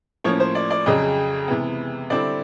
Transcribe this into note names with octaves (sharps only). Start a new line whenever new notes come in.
A2 F3 A#3 C#4 C#5
C5
D5
D5
F2 C#3 F#3 D#5
C3 E3 G#3 B3
D3 G3 C4 E4 D5